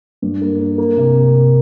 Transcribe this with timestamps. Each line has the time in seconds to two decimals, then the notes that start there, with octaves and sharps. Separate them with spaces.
0.22 G2
0.41 A#3
0.60 A#3
0.78 A#3
0.97 C3